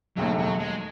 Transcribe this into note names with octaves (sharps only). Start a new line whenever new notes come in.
E1 D#2 D#3 F#3 A3
F#3
G#3